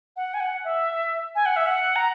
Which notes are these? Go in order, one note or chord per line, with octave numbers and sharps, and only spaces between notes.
F#5
G#5
F#5
E5
G#5
F#5
E5
F#5
A#5